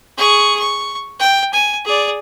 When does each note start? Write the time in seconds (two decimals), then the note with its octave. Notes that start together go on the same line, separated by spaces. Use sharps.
0.18 G#4 C#6
0.59 C#6
1.20 G5
1.53 G#5
1.85 G#4 D5